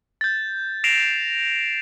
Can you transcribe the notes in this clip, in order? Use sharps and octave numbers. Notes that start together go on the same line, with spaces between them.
G6 A6
A#6 C7 D7 E7 F7